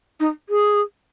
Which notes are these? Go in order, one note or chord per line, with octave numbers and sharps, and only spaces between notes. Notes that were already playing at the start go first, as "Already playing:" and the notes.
D#4
G#4